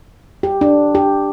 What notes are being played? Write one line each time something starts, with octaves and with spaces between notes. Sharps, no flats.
G4
D4
G4